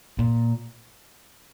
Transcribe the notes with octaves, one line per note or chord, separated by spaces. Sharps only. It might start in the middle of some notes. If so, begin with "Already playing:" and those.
A#2